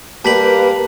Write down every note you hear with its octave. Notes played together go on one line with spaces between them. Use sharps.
G3 A#3 G4 B4 A5 B6 F#7